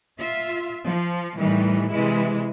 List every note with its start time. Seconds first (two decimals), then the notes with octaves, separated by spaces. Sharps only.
0.18 F4 E5
0.85 F3
1.37 A2 D#3 E3 G3
1.91 C3 E3 G#3 E4